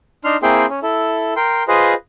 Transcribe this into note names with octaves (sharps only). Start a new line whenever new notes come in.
D4 D#4 C6 F6
A#3 C4 E4 G#4 G5 C6
C#4
E4 A4
A#4 G5 C6
F4 G#4 B4 C5 D#5